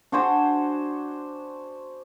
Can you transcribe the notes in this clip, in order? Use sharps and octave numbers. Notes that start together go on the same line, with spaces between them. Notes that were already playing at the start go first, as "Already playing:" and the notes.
D4 F#4 C5 G#5